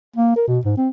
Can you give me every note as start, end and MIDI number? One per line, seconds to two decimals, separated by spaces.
0.16 0.35 58
0.36 0.43 70
0.48 0.59 47
0.65 0.73 44
0.77 0.89 60